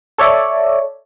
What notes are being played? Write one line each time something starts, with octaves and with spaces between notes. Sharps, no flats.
A4 C#5 D5 E5